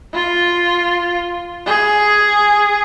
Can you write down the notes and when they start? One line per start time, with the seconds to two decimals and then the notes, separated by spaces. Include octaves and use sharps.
0.14 F4
1.66 G#4